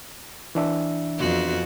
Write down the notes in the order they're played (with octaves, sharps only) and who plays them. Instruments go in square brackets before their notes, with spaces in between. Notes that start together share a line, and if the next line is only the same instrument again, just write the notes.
[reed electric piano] E3 D4 E5
[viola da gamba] F2 B3 F#4